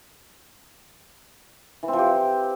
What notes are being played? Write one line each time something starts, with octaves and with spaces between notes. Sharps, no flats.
E3
C4
F3
G4